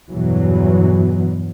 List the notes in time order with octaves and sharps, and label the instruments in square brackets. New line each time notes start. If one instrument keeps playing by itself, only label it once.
[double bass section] E2 G2 B2 E3 F#3